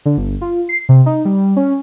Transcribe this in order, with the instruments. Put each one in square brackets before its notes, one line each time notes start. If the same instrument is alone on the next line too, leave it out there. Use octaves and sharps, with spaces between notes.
[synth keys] D3
G1
F4
C7
C3
D#4
G3
C#4